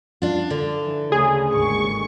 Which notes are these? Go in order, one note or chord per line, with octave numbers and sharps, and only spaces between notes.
D4 F4
D3
E3
D2 C#3 G#4
G#1 D#2 C#6